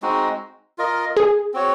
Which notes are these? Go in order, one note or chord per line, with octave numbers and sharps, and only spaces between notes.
G#3 C4 D#4 F#4
F4 A#4 D#5
G#4
C4 F#4 C#5